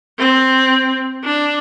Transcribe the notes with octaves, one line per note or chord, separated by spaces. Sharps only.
C4
D4